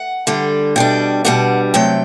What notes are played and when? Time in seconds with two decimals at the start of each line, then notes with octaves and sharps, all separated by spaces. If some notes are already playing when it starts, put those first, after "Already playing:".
Already playing: F#5
0.27 D3 G3 D4
0.76 B2 G3 D4 G5
1.25 B2 G3 D4 F#5
1.74 C3 F#3 A3 G5